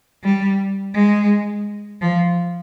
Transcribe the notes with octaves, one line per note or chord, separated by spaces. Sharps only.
G3
G#3
F3